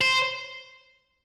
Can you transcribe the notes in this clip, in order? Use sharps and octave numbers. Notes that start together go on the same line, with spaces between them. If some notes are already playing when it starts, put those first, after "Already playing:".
C5